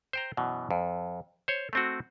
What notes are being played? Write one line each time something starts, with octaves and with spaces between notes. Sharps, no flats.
C5 G5 A#5
F#2 B2 E3
F2
C5 C#5
A3 C4 F#4